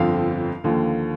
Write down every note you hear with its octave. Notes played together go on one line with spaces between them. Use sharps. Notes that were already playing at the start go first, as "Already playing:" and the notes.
Already playing: G1 F2 D3 F3 C4 F5
D#2 D3 F3